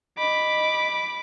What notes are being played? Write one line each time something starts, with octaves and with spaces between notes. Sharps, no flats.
D#5 B5 D6